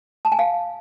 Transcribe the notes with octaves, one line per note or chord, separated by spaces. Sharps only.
A5
G#5
F5